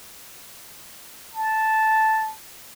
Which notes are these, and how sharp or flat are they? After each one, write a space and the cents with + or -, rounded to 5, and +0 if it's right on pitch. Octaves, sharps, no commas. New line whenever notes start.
A5 -5